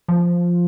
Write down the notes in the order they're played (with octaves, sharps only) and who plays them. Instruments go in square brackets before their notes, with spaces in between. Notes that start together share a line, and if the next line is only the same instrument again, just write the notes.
[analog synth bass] F3